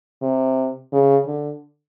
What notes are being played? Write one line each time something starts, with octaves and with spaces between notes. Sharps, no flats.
C3
C#3
D3